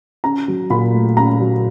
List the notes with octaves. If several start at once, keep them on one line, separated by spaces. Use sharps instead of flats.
C#4 A#5
F#3
A#2 B5
A3
C#4 A#5
F#3